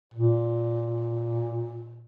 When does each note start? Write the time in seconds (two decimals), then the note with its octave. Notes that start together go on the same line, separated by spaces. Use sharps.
0.14 A#2